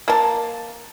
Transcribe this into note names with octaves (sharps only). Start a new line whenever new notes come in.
A#3 A5